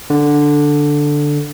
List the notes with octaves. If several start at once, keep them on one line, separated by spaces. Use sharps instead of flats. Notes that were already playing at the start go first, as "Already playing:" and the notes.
D3